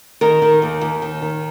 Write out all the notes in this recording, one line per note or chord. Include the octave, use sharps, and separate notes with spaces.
D#3 A#4
D#3
D#2
D#2
D#3
D#3